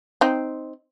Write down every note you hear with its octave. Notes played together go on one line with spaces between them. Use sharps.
C4 D#4